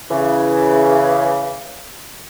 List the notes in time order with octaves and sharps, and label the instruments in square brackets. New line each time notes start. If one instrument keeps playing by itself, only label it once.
[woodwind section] C#3 E3